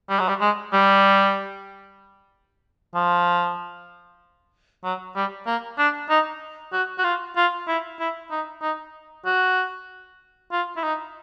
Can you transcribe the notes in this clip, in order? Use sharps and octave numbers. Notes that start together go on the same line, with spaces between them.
G3
F#3
G3
G#3
G3
F3
F#3
G3
A#3
D4
D#4
F#4
F#4
F4
F4
E4
E4
D#4
D#4
F#4
F4
E4
D#4